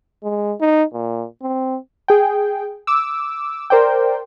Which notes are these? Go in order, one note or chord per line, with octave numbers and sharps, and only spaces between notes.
G#3
D#4
A#2
C4
G#4 G5
D6 E6
A#4 C5 D5 G5